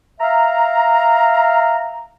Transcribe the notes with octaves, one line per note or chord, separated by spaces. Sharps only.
E5 F5 A#5